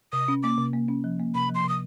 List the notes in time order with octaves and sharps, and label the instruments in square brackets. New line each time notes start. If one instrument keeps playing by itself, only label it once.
[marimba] C3 [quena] D#6
[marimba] C#4
[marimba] A#3 [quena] D6
[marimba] C3
A#3
C#4
F3
A#3
[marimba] C3 [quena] B5
[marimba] F3
[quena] C6
[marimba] C3 [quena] D#6